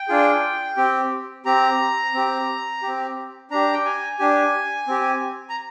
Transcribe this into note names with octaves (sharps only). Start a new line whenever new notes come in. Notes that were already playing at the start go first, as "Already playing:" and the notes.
Already playing: G5
D4 F4 G#4
C4 G4
C4 G4 A#5
C4 G4
C4 G4
D4 G4 A#5
G5
G#5
D4 G4 G#5
C4 G4
A#5